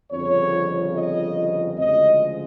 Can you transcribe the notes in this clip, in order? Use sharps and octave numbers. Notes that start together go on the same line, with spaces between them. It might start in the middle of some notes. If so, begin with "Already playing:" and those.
G1 F2 C#3 C#5
D#5
D2 C#3 F3 G#3 D#5